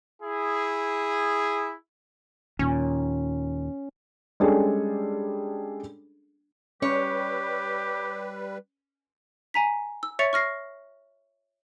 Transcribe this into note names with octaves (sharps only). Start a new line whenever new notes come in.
E4 G#4
D#2 A#2 C#4
G3 G#3 C#4 D4 G#4 A4
G3 C#4 G4 B4 C#5
G#5 A#5 B6
E6
C#5 E5 C#6 A6 C#7 F7
C#6 F6 A#6 C7